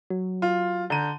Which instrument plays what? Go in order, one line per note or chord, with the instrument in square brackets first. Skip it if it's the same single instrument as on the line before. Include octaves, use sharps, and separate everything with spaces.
[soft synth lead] F#3
[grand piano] F4
[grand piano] D3 A#5 D#7 [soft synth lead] G6